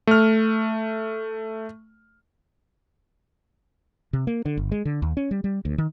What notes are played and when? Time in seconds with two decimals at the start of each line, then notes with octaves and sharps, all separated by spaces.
0.07 A3 F6
4.13 C3
4.27 A#3
4.45 D3
4.57 G1
4.72 G#3
4.85 D3
5.02 D#2
5.17 C#4
5.31 G3
5.44 G3
5.65 D2
5.78 D#3